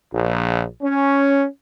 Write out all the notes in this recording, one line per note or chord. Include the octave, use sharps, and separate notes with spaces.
A#1
C#4